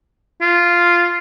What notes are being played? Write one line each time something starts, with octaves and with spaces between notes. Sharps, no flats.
F4